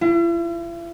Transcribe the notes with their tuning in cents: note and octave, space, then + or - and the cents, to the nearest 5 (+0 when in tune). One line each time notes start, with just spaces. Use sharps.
E4 +45